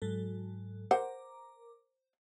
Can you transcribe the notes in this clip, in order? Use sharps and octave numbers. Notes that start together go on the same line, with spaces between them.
G#2 F#3 A4
A#4 C5 F#5 A#5 D6